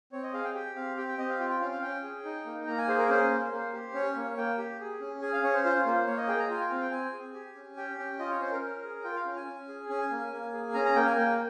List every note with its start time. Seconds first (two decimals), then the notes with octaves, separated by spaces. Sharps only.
0.12 C4 C#5
0.23 D#5
0.33 G#4 F5
0.44 G5
0.54 G4 G5
0.76 C4 F5
0.97 G4 G5
1.08 G5
1.18 C4 D#5
1.29 F5
1.40 F4 G5
1.50 G5
1.61 C#4 F5
1.71 F5
1.82 C#4 G5
2.03 G#4
2.25 D#4
2.46 A#3
2.67 A#3 A#5
2.78 G#5
2.88 G#4 C5
2.99 A#4
3.09 C#4 C5
3.31 A#3
3.52 A#3
3.73 G4
3.94 C#4 C#5
4.16 A#3
4.37 A#3 G5
4.58 G4
4.80 G#4
5.01 C#4
5.22 G#4 G#5
5.33 F5
5.43 C#4 C#5
5.54 C5
5.65 F4 C5
5.86 A#3 C5
6.07 A#3 C#5
6.17 D#5
6.28 G#4 G5
6.39 A#5
6.49 F4 G#5
6.60 G5
6.71 C4 F5
6.81 G5
6.91 C4 G#5
7.13 G#4
7.34 G4
7.56 C#4
7.77 G4 G5
7.98 C#4 G5
8.19 F4 D#5
8.30 C#5
8.41 C#4 C5
8.51 A#4
8.62 C#4
8.84 G#4
9.04 F4 G5
9.15 F5
9.26 C#4
9.36 G#5
9.47 C#4
9.68 G#4
9.89 C#4 G#5
10.11 A#3
10.33 A#3
10.54 G#4
10.74 C#4 A#5
10.85 A#5
10.96 A#3 G5
11.06 G#5
11.17 A#3 G5